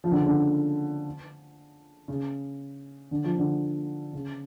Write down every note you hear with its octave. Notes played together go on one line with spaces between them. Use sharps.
F3
D3
C#3
D3
C#3
D3
F3
D3
C#3